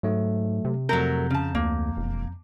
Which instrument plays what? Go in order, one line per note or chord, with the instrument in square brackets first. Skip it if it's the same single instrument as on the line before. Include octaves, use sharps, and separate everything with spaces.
[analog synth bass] G#2 [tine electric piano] F#3 A3
[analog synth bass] C3
[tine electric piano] F2 A#5 G6 [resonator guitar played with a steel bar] F#3 A3 A#4
[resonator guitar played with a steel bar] C#3 A5
[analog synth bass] D2 [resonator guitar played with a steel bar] A#3
[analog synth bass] E1